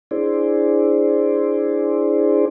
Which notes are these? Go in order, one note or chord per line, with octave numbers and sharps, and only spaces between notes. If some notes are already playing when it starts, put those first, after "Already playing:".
D4 E4 G#4 C5 D5